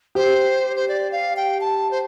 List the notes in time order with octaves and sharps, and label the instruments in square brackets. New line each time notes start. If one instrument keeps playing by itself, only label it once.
[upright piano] G4 [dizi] C5
[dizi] C5
D5
F5
G5
A5
C5